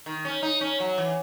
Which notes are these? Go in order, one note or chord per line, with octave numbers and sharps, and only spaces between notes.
D#3
C#4
D#4
C#4
F#3
E3